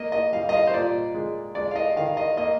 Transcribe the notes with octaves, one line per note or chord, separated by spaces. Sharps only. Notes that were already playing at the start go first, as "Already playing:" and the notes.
Already playing: A#3 D#5
D#5
G3 F5
D#5
F5
C5
A#2 D5
G#3
G#3 D5
F5
D#5
D#3 F5
D#5
A#3 D#5